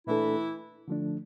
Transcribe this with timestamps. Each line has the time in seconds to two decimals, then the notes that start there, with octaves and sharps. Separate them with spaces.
0.07 A#2 E3 A3 D4 E4 A4
0.88 D3 F3 A3 D4